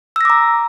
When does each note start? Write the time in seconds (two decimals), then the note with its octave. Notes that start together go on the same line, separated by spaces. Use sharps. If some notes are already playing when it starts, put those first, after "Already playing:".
0.16 E6
0.21 A#6
0.25 D6
0.30 A#5